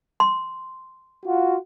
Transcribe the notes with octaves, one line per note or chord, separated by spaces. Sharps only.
C6
F4 F#4